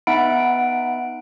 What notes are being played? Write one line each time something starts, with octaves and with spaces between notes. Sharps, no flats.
B3 D#4 E5 F#5 B5 D7